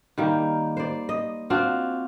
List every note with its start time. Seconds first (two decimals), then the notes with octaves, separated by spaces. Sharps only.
0.18 D#3 G3 A#3
0.77 C5 D5
1.09 D#5
1.50 C4 D4 F4 F#4